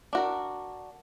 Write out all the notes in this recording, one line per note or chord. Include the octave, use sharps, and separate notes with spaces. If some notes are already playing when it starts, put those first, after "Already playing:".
D4 F#4 A#4